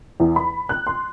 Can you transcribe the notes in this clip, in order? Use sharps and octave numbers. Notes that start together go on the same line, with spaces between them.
E2
B5
F#6
C6